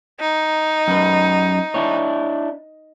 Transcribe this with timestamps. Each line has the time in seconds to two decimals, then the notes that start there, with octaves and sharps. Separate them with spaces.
0.20 D#4
0.88 F#2 B4
1.74 D4 E4 C#5